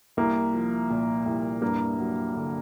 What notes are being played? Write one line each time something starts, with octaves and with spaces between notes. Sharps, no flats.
C2 A#3
F3
A#2
C2
G2 A#3
F#3
D3